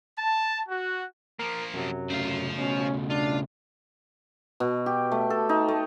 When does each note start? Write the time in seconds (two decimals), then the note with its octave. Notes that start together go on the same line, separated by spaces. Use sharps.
0.18 A5
0.68 F#4
1.39 F3 A#3 A#4
1.74 F#2 C3 F#3
2.10 C#3 A3 C5 F5
2.58 B2 C#4
3.10 D4 F4
4.60 B2
4.86 G4
5.12 A3
5.30 A4
5.49 D#4
5.68 A3